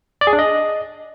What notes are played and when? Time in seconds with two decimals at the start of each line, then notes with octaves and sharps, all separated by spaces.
0.21 D5
0.27 G#4
0.33 D4
0.39 D#5